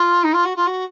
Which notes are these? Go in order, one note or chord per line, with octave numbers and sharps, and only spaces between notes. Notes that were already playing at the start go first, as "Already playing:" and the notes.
Already playing: F4
D#4
F4
F#4
F4
F#4